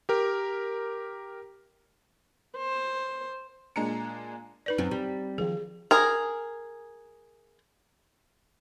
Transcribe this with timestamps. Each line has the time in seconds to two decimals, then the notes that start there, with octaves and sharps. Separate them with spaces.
0.09 G4 A#4
2.57 C5
3.76 A#2 G#3 D4 A#5 C#7
4.66 D#4 B4 D5
4.78 F#2 C4
4.91 G3
5.38 D#3 F3 G#4
5.91 G#4 A#4